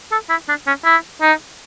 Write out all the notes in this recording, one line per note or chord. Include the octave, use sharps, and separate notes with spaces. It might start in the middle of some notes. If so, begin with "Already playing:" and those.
A4
E4
D4
C#4
E4
D#4